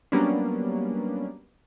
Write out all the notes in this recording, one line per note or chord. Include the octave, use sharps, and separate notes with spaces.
F#3 G3 A#3 B3 C#4 D4